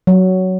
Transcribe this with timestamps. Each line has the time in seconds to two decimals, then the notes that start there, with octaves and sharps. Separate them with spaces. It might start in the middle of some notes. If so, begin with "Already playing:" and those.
0.07 F#3